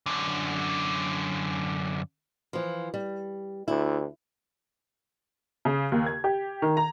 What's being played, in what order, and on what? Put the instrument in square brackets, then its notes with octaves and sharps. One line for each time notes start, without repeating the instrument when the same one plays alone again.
[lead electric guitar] F#2 D3
[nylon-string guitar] E3 F3
G3
[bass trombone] D2 [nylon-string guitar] E4
[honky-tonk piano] C#3
D#2
G#6
G4
D#3
A#5